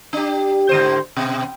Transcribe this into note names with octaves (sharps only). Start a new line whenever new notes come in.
D4 G4
G#2 D3 C5
B2